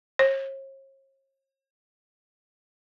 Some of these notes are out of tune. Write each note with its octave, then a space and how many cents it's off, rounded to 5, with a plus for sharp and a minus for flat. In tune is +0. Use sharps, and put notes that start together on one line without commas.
C#5 -45